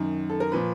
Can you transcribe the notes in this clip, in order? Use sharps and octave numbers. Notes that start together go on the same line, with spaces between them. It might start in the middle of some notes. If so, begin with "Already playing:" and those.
Already playing: F#2 D#3
A4
A#4
A#2 F3 B4